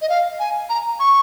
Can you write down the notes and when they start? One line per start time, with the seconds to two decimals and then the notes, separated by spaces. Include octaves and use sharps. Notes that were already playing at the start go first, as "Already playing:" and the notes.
0.02 D#5
0.09 F5
0.40 G#5
0.69 A#5
1.00 C#6